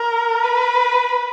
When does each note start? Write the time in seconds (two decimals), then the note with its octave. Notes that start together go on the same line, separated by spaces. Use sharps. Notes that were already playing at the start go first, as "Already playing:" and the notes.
Already playing: A#4
0.43 B4